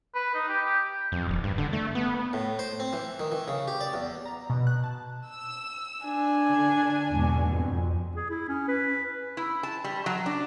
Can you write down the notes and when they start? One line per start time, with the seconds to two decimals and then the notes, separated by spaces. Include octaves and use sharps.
0.15 B4
0.34 D#4
0.48 G4
0.65 G4
1.12 F2
1.29 D#1
1.44 G2
1.58 D3
1.73 A3
1.95 B3
2.33 A2
2.59 C5
2.80 C4
2.93 E3
3.19 D#3
3.32 E3
3.48 C#3
3.68 G4
3.81 D5
3.93 E2
4.26 A#5
4.50 B2
4.67 F#6
4.84 A5
5.30 E6
6.04 D4 G#5
6.48 D3
7.09 E2 G#2 B2
7.50 F2
8.16 G#4
8.30 E4
8.49 C#4
8.68 B4
9.37 E4
9.63 A5
9.84 G3
10.06 F#3
10.26 D4